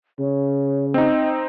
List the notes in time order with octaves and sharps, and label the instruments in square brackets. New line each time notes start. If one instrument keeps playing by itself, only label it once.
[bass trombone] C#3 [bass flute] C#5
[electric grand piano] C4 D#4 [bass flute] D#5